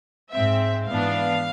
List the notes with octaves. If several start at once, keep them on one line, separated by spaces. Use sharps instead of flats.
G#2 G#3 C4 E5
G#2 E3 B3 D4 F5